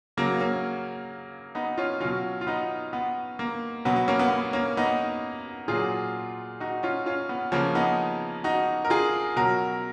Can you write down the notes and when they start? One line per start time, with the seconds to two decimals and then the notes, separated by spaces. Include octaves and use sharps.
0.17 C#3 F#3 A#3
0.40 A#3 C#4
1.55 B3 D#4
1.77 C#4 F4
2.00 B2 F#3 C#4 F4
2.41 F4
2.47 B3 D#4
2.93 B3
3.39 A#3
3.85 B2 F#3 B3
3.96 B3
4.08 A#3 C#4
4.19 B3
4.31 B3
4.53 A#3 C#4
4.77 B3 D#4
5.68 A#2 F#3 F4 G#4
6.60 D#4 F#4
6.83 C#4 F4
7.06 C#4 F4
7.29 B3
7.52 C#3 F3 A#3 C#4
7.75 B3 D#4
8.44 D#4 F#4
8.85 A#4
8.90 F4 G#4
9.36 B2 F#3 F#4 A#4